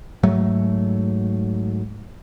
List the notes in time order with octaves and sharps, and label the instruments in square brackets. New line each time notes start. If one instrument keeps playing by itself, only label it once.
[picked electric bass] G#2 F#3 A3